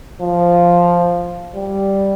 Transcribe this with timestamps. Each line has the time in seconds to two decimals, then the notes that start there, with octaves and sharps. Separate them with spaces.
0.22 F3
1.55 G3